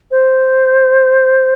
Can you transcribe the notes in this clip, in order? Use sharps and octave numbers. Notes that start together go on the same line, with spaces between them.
C5